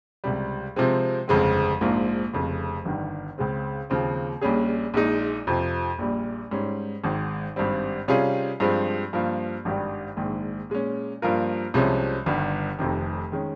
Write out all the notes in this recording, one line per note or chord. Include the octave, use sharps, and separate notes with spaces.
C#2 C3 G3
C3 F3 G#3 C4
G1 F2 C#3 G#3 C4
A#1 G#2 F3 A#3
F1 F2 C#3
G1 G2 D#3
C#2 C#3 G#3 C4
D#2 C#3 F3 C4
A#1 A#2 G3 C#4 G#4
A#1 A#2 G#3 D#4
F2 C3 F3 C4
A#1 A#2 G3
G#2 G3 C#4
G#1 G#2 D#3
G#1 G2 G3 C4
C3 G3 C#4 F4 G#4
G2 F3 G#3 C4
G2 F3 A#3
G#1 G2 D#3 G3
A#1 G#2 D#3
A#2 G#3 C#4
G2 F3 A#3 F4 A#4
C2 C3 F3 G#3 C#4
G1 G2 D#3
F1 F2 C3 D#3
D#3 G#3 C#4